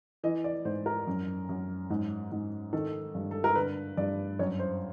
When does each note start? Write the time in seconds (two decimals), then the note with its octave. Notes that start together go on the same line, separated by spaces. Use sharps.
0.24 E3 D#5
0.44 D5
0.65 G#2 C5
0.86 A#4
1.07 F#2
1.49 F#2
1.90 G#2
2.32 G#2
2.73 D#3 A4
3.15 G2
3.31 A4
3.44 A#4
3.55 D3 B4
3.97 G2 D5
4.39 F#2 C#5
4.59 C5